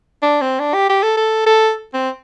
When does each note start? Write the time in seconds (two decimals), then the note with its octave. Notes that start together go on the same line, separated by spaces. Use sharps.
0.22 D4
0.41 C4
0.59 D4
0.74 G4
0.89 G4
1.03 A4
1.17 A4
1.46 A4
1.94 C4